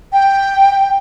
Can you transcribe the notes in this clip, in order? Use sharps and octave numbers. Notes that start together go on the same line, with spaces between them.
G5